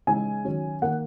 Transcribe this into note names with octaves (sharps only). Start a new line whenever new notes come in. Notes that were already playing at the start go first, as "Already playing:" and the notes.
C#3 E3 G#3 D#4 G#5
D#3 F#3 C#4
D#3 A#3 F#5